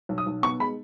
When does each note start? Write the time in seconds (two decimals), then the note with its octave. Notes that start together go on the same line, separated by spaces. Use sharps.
0.09 B1
0.18 D#6
0.26 B1
0.43 B3 C#6
0.60 G#3 B5